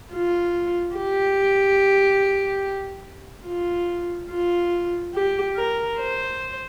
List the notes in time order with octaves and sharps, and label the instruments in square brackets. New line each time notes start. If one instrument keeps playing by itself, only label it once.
[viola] F4
G4
F4
F4
G4
A#4
C5